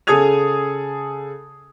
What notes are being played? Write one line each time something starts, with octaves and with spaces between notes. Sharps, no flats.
C#3 G#4 A4 D#6 G#6 F7